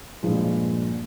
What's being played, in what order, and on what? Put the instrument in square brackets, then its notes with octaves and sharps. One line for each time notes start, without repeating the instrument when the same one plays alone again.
[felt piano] G2 A#2 F3 G#3